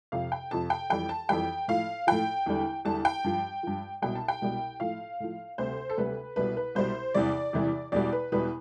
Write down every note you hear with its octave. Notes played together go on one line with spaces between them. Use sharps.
F2 C3 F3 F5
G5
F2 C3 F3 A5
G5
F2 E3 G3 G5
A5
F2 E3 G3 G5
A2 F3 F5
A2 F3 G5
E2 D3 G3
E2 D3 G3 A5
G5
G2 F3
G2 F3
C2 B2 G3 G5
A5
G5
C2 B2 G3
A2 F3 F5
A2 F3
D2 C3 G3 C5
A4
D2 C3 G3 B4
C2 B2 G3 B4
B4
C2 B2 G3 C5
E2 C3 E3 G3 D5
E2 C3 E3 G3
E2 B2 G3 D5
B4
E2 B2 G3 B4